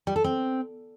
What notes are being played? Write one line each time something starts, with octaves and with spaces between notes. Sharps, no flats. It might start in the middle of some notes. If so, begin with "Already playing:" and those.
G3
A4
C4